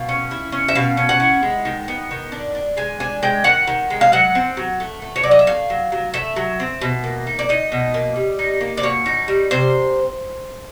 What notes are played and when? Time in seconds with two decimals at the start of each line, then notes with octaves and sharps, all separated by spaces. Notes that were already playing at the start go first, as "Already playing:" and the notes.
Already playing: B2 F5
0.09 C#4
0.31 E4
0.52 C#4
0.68 E5
0.75 B2 F5
0.97 C#4
1.09 F#5
1.20 E4
1.43 G#3
1.65 D#3
1.88 B3
2.11 D#3
2.32 D4
2.55 D4
2.77 G#3 G#5
3.00 D4 G#5
3.23 G#3 G5
3.44 D#3 F#5
3.67 D#3
3.90 G#3
4.01 F5
4.12 F#3 F#5
4.35 C4
4.57 F#3
4.80 A3
5.02 A3
5.16 C#5
5.23 F#3 D5
5.31 D#5
5.39 E5
5.47 A3 F5
5.70 F#3
5.92 F#3
6.14 A3 E5
6.36 F#3
6.60 C4
6.82 B2
7.04 A#3
7.27 D#4
7.39 D5
7.49 D#4 D#5
7.72 B2
7.94 A#3
8.16 G3
8.39 D#4
8.61 A#3
8.77 D5
8.83 B2 C#5
9.06 D#4
9.28 G3
9.51 C3 C5